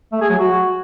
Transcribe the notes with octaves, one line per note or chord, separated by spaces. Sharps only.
A3
G#4
F#3
F#4